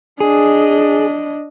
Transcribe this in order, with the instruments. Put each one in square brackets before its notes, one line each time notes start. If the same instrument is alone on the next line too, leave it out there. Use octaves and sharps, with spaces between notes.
[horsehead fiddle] D4 D#5 [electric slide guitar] G#4